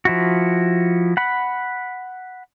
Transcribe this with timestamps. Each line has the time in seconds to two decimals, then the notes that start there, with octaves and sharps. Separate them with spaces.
0.05 F3 E4 F#4
1.17 F#5 B5